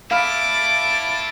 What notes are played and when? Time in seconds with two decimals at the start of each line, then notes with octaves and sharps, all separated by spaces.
0.11 E4 A4 F5 B5 D6 F6 A6